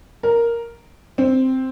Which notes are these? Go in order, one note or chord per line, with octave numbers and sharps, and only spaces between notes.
A#4
C4